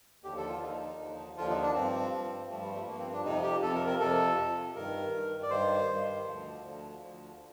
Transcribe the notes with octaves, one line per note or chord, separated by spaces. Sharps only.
D#2 D3 F3 G4
A4
F4
D#2 D3 F3 D#4
D#2 D3 F3
D#2 D3 F3 F4
D#4
D4
G2 F3 C4
G2 F3
G2 F3 A3
G3
A3
G2 F3 A#3
C4
D4
F2 C3 F3 D#4
G4
F2 C3 F3 A4
A#4
A#4
F2 C3 F3 A4
F2 C3 F3
G2 D#3 A#4
G2 D#3
D5
G2 D#3 C5
G2 D#3
D2 D3 F3
D2 D3 F3
D2 D3 F3